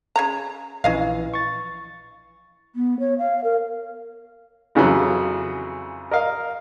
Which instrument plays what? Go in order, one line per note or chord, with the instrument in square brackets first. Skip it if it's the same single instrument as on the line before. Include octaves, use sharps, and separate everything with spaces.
[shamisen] C#3 C#5 A#5
[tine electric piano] A#1 E3 [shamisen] C#4 D#5 F5
[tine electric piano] C#6 A6
[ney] B3
C#5
F5
A#4
[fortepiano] F2 C#3 E3 F#3
A#4 D#5 F5